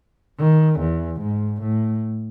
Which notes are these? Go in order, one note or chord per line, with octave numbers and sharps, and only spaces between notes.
D#3
E2
G#2
A2